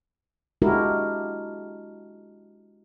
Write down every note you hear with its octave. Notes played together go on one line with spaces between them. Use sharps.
G#3 D4 E4 F#4 G4 A#4